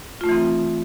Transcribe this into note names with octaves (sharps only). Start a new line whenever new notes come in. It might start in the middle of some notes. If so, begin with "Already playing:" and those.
E3 A3 C4 D#4 F4